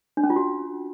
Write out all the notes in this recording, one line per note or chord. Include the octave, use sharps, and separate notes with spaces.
D4
C#4
F4
F#4